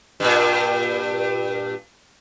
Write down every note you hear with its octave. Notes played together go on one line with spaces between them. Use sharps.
G2 A#2